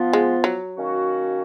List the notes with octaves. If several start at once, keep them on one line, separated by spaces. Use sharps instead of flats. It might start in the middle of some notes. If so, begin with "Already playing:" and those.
Already playing: F3 B3 F4
G#3
F#3
D#3 A#3 C#4 F#4